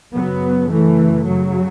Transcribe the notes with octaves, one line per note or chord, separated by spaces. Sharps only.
F#2 C#3 F#3 B3
E3 A3
C#3 F#3